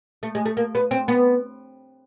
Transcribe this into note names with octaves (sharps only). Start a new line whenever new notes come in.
A3
G#3
A3
A#3
B3
C4
B3